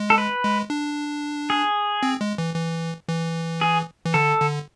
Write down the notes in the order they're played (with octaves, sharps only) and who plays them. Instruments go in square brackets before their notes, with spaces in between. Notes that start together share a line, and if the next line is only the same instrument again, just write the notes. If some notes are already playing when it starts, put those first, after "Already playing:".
Already playing: [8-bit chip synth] G#3
[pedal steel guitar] A4
B4
[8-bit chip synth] G#3
D4
[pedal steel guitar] G#4
[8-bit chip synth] C4
G#3
E3
E3
E3
[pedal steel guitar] G#4
[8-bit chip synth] E3
[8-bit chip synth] D3 [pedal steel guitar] A4
[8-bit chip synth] D3